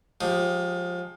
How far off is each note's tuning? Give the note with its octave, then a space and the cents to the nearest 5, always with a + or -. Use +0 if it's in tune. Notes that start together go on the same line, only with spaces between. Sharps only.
F3 +25 G#3 +0 G4 +0